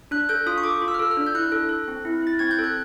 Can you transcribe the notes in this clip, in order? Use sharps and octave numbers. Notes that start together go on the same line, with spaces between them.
D4 F#6
A4 G6
F4 D#6
C#6
A4 D6
F4
E6
F6
A4 E6
F6
D4
G6
E4 F#6
A4
A4
C4
E4
E4 A6
C4 G#6
G6
A4
F#6